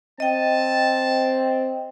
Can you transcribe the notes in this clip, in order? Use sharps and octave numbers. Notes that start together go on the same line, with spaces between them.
C4 D#5 G5 A5